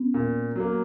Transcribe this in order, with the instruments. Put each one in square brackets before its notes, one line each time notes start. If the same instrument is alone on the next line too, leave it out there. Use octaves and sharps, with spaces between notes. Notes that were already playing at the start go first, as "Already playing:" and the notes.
Already playing: [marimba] B3 C#4
[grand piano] A#2
F#3 A#3